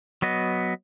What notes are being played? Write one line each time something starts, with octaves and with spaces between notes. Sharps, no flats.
F#3 B3 D#5